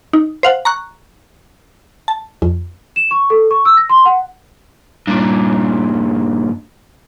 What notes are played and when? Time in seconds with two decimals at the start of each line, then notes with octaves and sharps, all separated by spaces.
0.13 D#4
0.43 C5 F5 F#5
0.65 A#5 C#6 F#6
2.08 A5
2.42 F2
2.96 E7
3.11 C#6
3.30 A4
3.51 C#6
3.65 E6
3.77 A#6
3.90 C6
4.05 F#5
5.08 G2 A#2